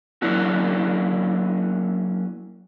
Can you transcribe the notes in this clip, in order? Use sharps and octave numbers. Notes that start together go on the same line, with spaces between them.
F#3 A#3 C#4 D4 E4 F#4